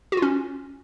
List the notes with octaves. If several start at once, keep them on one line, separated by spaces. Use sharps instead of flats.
F#4
F4
C#4